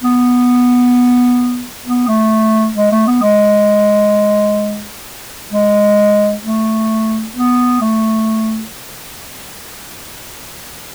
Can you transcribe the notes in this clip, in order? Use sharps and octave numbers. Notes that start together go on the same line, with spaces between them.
B3
B3
A3
G#3
A3
B3
G#3
G#3
A3
B3
A3